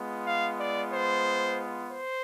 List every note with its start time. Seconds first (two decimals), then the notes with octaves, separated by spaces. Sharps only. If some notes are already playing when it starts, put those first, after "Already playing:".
Already playing: G#3 B3 F4
0.26 F5
0.57 D5
0.91 C5
1.89 C5